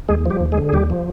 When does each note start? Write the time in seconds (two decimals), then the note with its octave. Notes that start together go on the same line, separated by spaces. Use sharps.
0.08 D#2 G#3 G#4
0.26 F3 G3 G4
0.41 D#2
0.52 G#3 G#4
0.58 D3
0.69 G#4
0.73 D#2 G3 G4
0.90 F3